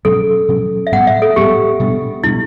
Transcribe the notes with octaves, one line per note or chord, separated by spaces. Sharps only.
B2 F#3 C#4 A4
B2 F#3 C#4
E5
A2 G3 B3 F#5
E5
A4
A2 G3 B3 G4
B2 G3 B3 D4
B2 G3 B3 D4 E4